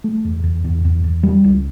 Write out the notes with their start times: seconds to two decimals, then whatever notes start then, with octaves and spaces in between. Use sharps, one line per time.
0.04 A3
0.25 E2
0.44 E2
0.64 E2
0.85 E2
1.04 E2
1.23 G3
1.44 C#2